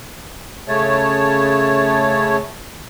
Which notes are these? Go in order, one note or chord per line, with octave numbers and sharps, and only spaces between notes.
C#3 A3 C#5 A5